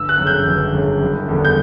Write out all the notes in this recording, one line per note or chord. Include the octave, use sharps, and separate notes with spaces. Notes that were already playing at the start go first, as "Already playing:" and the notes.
Already playing: G1 E6
F#6
F#2
C#3 G6
G1
F#2 C#3
F#1
E2 D3 G3
G6